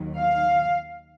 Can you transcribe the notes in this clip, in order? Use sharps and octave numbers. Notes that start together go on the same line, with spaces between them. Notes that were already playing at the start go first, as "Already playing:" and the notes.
Already playing: D#2 D#3 F#3
F5